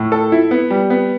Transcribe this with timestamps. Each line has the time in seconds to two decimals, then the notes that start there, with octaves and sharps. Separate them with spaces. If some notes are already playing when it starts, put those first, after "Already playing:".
Already playing: A2
0.12 A4
0.32 E4
0.51 B3
0.70 G3
0.90 B3